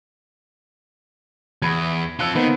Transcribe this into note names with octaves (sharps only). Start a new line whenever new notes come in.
E2 B5 G#6
C4 F4 E6 F#6 C#7
D#3 A#3 B3 C5